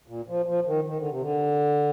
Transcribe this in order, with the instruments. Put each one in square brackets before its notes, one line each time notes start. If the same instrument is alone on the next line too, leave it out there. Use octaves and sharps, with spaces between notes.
[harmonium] A#2
F3
F3
D#3
D#3
D3
C3
D3